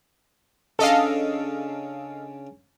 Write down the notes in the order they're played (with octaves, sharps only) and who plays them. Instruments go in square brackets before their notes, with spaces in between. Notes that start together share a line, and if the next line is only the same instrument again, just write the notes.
[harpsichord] C#3 C#4 D4 [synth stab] A4 D#5 F5